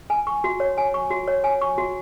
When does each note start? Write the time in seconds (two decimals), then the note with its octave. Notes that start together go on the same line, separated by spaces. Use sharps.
0.10 G#5
0.27 C#6
0.44 F#4
0.60 C#5
0.78 G#5
0.94 C#6
1.10 F#4
1.28 C#5
1.44 G#5
1.61 C#6
1.78 F#4